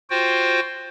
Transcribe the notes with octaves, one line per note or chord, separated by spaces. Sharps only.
F4 F#4 C5 G5